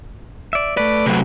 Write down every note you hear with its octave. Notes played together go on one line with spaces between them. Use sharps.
D5 E5
A3 B4 D5
C3 F#3